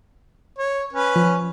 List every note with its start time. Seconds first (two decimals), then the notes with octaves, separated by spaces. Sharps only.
0.59 C#5
0.93 C#4 B4
1.16 F3